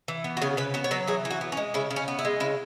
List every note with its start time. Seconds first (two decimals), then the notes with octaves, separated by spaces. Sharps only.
0.08 E3
0.24 B3
0.37 F#4
0.42 C#3 G#4
0.57 C#3 B4
0.74 B3 F#4
0.84 C#5
0.91 F#3 B4
1.07 E3 G#4
1.25 E3
1.31 F#4
1.41 B3
1.52 C#4
1.57 G#3
1.74 C#3 E4
1.91 C#3
1.96 C#4
2.08 B3
2.19 E4
2.25 G#3
2.40 C#3 E4